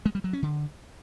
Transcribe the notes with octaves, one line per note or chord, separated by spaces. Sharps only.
G#3
G3
F#3
C#4
D3